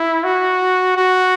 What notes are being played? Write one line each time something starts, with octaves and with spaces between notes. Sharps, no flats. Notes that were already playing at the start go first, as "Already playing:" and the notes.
Already playing: E4
F#4
F#4